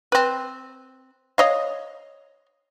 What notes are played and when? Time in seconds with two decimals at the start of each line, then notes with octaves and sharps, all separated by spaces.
0.12 C4 B4
1.38 C#5 D#5 F5